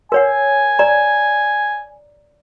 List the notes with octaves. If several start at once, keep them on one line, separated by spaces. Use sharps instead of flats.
A#4 C#5 F#5 G#5
D5 A#5